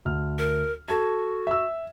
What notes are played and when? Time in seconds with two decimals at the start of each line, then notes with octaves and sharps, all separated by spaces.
0.05 D2 F6
0.38 A#4
0.88 F#4 A4 A5 G#6
1.47 E5 E6